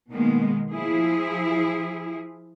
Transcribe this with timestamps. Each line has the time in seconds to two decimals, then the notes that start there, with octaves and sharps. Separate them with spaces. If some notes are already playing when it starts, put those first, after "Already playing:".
0.11 B2 D#3 G#3 A#3 B3
0.71 F3 E4 G#4